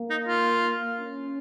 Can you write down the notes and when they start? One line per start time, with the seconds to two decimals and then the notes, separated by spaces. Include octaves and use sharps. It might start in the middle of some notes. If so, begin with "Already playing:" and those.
Already playing: A#3
0.10 D#4
0.28 F4
0.98 C#4